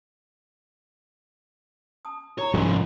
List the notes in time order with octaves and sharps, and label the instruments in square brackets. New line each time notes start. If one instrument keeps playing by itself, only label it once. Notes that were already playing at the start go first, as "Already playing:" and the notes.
[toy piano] A5 D#6
[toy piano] E4 A#5 [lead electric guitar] C#5
[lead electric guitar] C2 G#2 [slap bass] F3 [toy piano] C#4 A#4 G#5